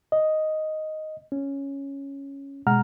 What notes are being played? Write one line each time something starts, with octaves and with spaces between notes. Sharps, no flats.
D#5
C#4
B2 G#3 F#5 A#5 F6